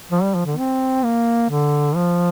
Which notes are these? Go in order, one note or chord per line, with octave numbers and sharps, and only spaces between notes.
F3
G3
F3
D3
C4
A#3
D3
F3